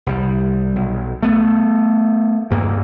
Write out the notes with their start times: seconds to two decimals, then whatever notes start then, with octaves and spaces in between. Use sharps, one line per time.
0.06 C2 G3
0.76 B1
1.23 A3 B3
2.51 D2 G2 A#3